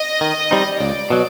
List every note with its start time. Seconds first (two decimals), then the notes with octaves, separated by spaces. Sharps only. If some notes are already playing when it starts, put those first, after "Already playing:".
Already playing: D#5
0.21 D#3
0.51 G3 C4 D#4
0.80 C#2 D5
1.10 B2 F#3